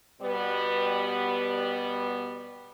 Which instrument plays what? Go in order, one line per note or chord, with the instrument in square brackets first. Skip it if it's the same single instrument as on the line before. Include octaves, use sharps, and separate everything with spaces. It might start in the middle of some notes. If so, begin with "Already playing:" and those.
[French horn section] B2 G3 B3